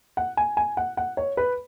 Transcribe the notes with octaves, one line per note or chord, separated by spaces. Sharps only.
F#5
G#5
G#5
F#5
F#5
C#5
B4